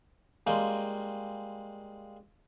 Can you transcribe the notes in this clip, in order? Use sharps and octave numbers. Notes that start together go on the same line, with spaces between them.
G3 G#3 A#3 C#4 F4 G5